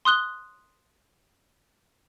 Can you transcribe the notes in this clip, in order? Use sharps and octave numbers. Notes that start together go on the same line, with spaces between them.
C6 D#6 F#6 G7